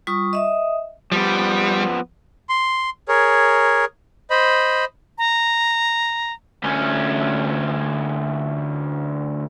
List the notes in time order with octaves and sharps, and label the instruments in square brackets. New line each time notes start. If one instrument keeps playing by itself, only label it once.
[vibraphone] G3 F4 C#6 D#6
D#5 E5 D#6
[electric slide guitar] F3 B3 [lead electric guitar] G3
[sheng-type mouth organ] C6
G#4 A#4 C#5
C5 D#5 B5
[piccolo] A#5
[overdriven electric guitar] D2 C#4